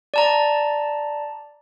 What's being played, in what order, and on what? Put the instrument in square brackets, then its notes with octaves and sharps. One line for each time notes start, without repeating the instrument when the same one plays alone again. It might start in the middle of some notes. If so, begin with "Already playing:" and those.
[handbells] D5 A5 A#5